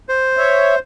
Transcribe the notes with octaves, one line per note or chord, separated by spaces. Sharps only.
C5
C#5 E5